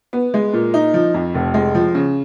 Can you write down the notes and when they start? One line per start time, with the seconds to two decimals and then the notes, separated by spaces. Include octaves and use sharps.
0.13 B3
0.34 G#3
0.53 A#2
0.74 D#4
0.94 F3
1.14 F2
1.34 F1
1.54 G#3
1.75 F3
1.95 C#3